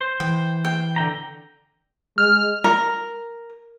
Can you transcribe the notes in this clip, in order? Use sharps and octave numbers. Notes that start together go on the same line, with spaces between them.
C5
E3 G5
G5
D3 G5 A#5
G#3 F6
A#4